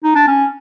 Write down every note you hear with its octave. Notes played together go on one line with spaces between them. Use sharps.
D#4
D4
C#4